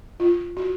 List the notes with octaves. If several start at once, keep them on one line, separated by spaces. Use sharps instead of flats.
F4
F#4